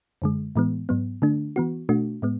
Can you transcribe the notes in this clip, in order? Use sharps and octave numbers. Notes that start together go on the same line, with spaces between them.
F#2 D3 G#3
A2 E3 G#3 B3
G#2 F#3 B3
D3 A3 D4
E3 B3 F#4
B2 A3 D4 F#4
A2 G#3 B3